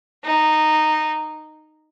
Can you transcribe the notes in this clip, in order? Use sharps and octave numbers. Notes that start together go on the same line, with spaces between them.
D#4